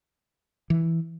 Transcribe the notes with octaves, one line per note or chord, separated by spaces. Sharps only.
E3